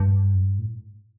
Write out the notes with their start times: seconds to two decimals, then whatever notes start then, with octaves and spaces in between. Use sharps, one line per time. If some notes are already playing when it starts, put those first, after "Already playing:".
Already playing: G2
0.34 F#2
0.42 G2
0.59 A2